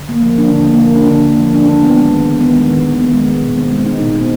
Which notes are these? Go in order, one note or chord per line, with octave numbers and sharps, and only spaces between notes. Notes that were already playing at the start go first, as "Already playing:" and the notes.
Already playing: D3
A#3
F3
D4
D3
A#3
F3
D4
D3
A#3
F3
D4
D#3
B3
G#3
D#3
D#3
B3
G#3
D#3
D#3
B3
G#3
D#3
B2
C4
G#3
D#4
B2
C4